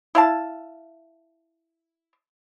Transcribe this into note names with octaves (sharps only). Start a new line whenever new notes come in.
E4 F5 A5